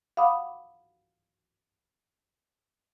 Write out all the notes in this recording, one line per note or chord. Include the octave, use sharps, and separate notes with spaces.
F5 F#5 B5 D6 D#6